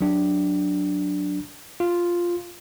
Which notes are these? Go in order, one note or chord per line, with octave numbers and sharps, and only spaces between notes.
F#3 D4
F4